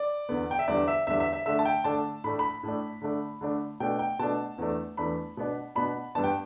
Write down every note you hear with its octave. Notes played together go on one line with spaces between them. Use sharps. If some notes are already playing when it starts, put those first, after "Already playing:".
Already playing: D5
E2 D3 B3
G5
E5
E2 D3 G3 D4 D5
E5
E2 D3 G3 D4 E5
E5
E5
D3 A3 D4 E5
A5
G5
D3 A3 D4 A5
A2 A3 D4 B5
B5
A2 A3 D4
D3 A3 D4
D3 A3 D4
B2 A3 D4 G5
G5
B2 A3 D4 A5
E2 E3 A3 D4
E2 E3 A3 D4 B5
B2 B3 D4
B2 B3 D4 B5
G2 G3 B3 D4 A5
G5